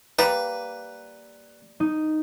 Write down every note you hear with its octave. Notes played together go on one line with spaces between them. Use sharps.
G3 A#3 B4
D#4